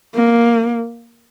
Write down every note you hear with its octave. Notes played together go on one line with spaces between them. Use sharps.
A#3